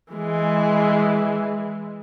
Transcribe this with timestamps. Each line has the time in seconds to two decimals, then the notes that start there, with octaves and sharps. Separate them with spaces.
0.13 E3 G#3